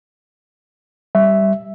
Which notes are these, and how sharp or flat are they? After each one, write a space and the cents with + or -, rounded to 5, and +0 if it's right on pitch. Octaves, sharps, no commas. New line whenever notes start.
G3 +0 E5 +0